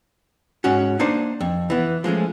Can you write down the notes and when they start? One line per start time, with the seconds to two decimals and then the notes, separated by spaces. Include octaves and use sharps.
0.64 G#2 C#4 F#4
0.99 A#3 D4 D#4 A#4 C5
1.41 F2
1.70 E3 B3
2.04 F3 G#3 A3 C#4